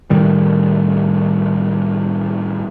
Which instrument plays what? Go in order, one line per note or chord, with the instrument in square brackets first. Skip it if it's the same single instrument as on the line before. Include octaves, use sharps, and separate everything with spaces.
[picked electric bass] A2 D#3 G3